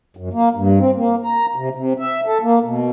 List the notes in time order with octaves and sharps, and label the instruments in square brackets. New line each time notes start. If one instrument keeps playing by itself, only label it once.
[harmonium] F#2
A#3
G2
C4
A#3
A#5
C3
C3
E5
A4
A#3
B2